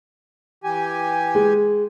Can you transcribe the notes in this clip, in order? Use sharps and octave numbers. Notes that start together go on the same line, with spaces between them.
E3 G4 G#5
G#3